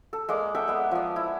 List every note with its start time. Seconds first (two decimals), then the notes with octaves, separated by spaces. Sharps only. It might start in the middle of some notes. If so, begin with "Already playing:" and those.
0.13 A4
0.29 G#3 A#3 D5
0.55 A4 E5 F#5 G5
0.68 G#3 B3
0.91 F3 D5
1.16 E4